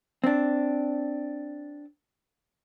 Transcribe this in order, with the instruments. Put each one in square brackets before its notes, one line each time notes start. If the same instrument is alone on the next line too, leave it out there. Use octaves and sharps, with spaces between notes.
[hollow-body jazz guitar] C4 D4